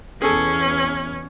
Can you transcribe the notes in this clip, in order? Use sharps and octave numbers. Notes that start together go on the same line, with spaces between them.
E2 B2 B3 C#4 G#4 A4